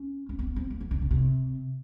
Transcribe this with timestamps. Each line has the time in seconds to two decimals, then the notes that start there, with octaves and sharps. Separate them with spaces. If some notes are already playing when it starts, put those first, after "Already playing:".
Already playing: C#4
0.29 C#4
0.39 C4
0.47 B3
0.56 C4
0.70 A#3
0.80 E3
0.91 D3
1.01 C#3
1.11 C3